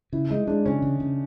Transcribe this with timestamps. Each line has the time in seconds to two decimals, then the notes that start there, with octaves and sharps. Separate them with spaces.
0.13 C#3 E4
0.30 G#3 D#4
0.47 G#3 D4
0.65 C#3 C#4
0.82 C#3
1.00 C#3